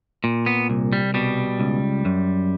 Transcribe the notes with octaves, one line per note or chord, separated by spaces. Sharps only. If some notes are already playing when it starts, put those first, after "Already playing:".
A#2
B3
C2
G3
B2 G3
C#2
F#2